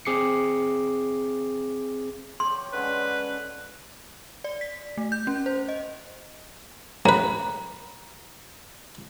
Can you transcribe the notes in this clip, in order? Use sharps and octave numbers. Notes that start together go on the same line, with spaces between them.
C4 G#4 D6 C7 C#7
G4 C#5 C6
D3 G#3 C#4 B4
D5
B6
A3
G6
C#4
C5
D#5
A1 B4 A#5